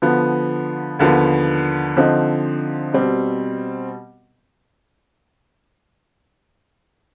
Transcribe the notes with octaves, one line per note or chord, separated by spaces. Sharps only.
D3 F3 B3
D#2 D3 F3 B3
D3 F3 C4 D#4
B2 G3 C4